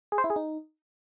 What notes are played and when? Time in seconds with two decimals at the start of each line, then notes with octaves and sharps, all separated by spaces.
0.12 G#4
0.18 C5
0.24 E4
0.30 G#4
0.36 D#4